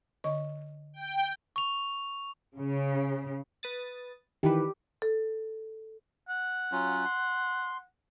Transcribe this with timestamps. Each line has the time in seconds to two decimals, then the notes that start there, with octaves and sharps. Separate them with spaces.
0.24 D3 D#5 C#6
0.94 G5
1.56 C#6 F7
2.57 C#3
3.63 B4 D#6 A6
4.43 D#3 E3 G4 B4
5.02 A4
6.29 F#5
6.72 F#3 C#4 F4
7.05 C6